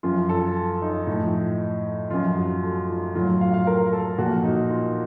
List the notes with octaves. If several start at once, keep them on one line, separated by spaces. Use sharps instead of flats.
F#2 F3 F4
A4
D#4
A2 F3
F#2 F3 F4
F#4
A4
F4
A2 F#3 F4
F5
F5
A#4
A4
A#2 F3 F#4
D#4
F4